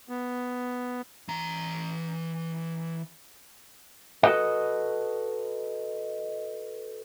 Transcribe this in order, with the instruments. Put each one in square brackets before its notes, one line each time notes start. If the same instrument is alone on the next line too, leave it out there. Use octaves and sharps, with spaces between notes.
[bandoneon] B3
[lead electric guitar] E3 A#5
[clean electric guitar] F#4 G4 A4 B4 D#5